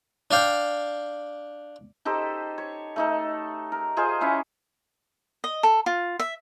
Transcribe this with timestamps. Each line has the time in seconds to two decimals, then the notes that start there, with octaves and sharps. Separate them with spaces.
0.31 D4 D5 F5 G5
2.05 D#4 G4 A4 C5
2.58 C#5
2.96 A3 D#4 A4
3.72 A#4
3.97 F4 G#4 C5 D#5
4.21 C#4 E4 C#5
5.44 D#5
5.63 A4
5.86 F4
6.19 E5